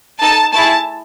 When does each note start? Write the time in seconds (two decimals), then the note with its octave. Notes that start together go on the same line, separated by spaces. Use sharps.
0.22 D#4 A4 A5
0.53 A3 E4 G#4 A5